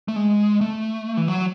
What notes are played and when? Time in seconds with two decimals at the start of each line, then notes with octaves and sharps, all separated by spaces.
0.08 A3
0.16 G#3
0.61 A3
1.17 E3
1.28 F#3